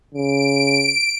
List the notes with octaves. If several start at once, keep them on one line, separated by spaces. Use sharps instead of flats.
C#3 D7